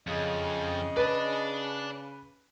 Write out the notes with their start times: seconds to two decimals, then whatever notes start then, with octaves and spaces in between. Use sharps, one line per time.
0.07 F2 C#3 D#5
0.97 B4 D5 A5